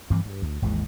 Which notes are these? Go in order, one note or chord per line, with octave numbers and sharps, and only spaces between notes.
G2 E3 F3 C4
G2
D2
G#1 D#2 E3 G#3